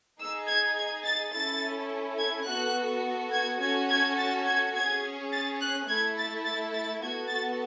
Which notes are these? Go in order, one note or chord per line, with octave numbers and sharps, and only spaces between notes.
D#4 G#4 E6
G#6
G#6
A6
C#4 E4 A4 A6
G#6
B3 F#4 A4 F#6
G#6
C#4 F#4 A4 G#6
G#6
A6
G#6
C#4 G#4 G#6
A6
F#6
A3 E4 A4 G#6
A6
A6
A6
B3 F#4 A4 G#6
A6